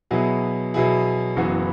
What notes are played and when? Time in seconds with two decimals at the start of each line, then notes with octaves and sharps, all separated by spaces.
0.11 B2 F#3 B3 E4 G#4
0.74 B2 F#3 B3 E4 G#4
1.36 F#1 F#2 E3 B3 F#4